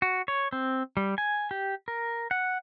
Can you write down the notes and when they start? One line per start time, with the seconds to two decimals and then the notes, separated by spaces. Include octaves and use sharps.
0.02 F#4
0.28 C#5
0.52 C4
0.97 G3
1.18 G#5
1.51 G4
1.88 A#4
2.31 F#5